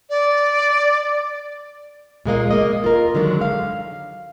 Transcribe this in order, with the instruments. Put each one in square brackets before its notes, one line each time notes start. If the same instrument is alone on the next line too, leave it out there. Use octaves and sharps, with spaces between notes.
[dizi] D5
[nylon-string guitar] A#2 G#3 A#3 D#5
A#3 D#5
F4 A#4
D3 D#3 F#3 G#3
F5